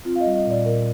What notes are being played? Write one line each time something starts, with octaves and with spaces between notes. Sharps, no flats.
C4 F4
F5
D#5
G3
D#5
A#2 D5
A#2 A#4